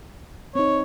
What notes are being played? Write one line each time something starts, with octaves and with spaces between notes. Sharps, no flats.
C4 D#4 C#5